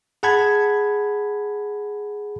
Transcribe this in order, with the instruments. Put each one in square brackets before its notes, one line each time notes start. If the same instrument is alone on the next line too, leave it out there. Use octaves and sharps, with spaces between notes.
[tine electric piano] G#4 F#5 A5 B5 G#6